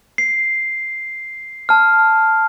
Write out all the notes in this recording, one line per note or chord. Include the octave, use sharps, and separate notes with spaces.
C7
A5 F6